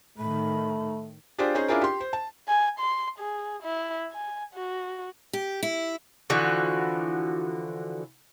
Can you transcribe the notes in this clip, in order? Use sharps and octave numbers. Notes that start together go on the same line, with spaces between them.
A2 D#3 A3 B5
D4 F4 G4 G#4 C5 D5
C#4 D#4 G#4 C5
C#4 D4 E4 F4 G#4 A#4
G4 C6
C5
A5
G#5
C6
G#4
E4
G#5
F#4
G4
E4
D3 E3 F3 F#4